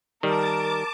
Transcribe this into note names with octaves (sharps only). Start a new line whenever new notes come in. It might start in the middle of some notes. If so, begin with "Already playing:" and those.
D#3 G3 A#4 A5 D6